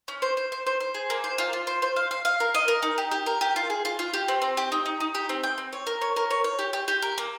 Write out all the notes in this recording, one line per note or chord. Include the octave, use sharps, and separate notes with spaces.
C#4
C5
C5
C5
C5
C5
G#4
A#3
C5
F4
F4
C5
C5
F5
F5
F5
A#4
D#5
A#4
D#4
G4
G4
A#4
G4
F4
G#4
F4
F4
G4
C4
C4
G4
D#4
D#4
D#4
G4
C4
G5
C4
C#5
A#4
C#5
A#4
C#5
C#5
G4
G4
G4
A#4
A#3